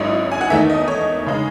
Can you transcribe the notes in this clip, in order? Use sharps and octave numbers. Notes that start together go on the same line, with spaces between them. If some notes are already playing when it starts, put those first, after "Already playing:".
Already playing: G#1 G#2 F#3 C#4 E4 D#5
G#5
F#5
E2 D#3 A3 D#4 E5
D#5
C#5
C#3 G#3 D#4